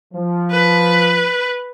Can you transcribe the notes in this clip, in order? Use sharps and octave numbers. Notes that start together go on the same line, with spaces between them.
F3
B4